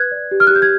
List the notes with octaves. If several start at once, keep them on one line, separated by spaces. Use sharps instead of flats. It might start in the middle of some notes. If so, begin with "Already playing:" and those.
Already playing: B4 F#6 G#6
D5
G4
F6
F#6
G4
G6
G#6